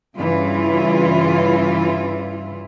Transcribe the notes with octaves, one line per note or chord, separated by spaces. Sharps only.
G2 C#3 E3 E4 F4